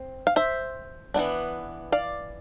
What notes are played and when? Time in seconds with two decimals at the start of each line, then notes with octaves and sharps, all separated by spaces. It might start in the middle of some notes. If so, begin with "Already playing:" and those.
Already playing: C4
0.27 F5
0.36 C5 E5
1.14 E3 G3 B3 D4
1.92 D5 F5